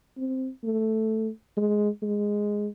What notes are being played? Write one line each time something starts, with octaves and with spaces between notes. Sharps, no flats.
C4
A3
G#3
G#3